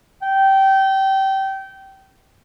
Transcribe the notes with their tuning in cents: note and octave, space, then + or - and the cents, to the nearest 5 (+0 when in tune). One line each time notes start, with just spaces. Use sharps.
G5 -20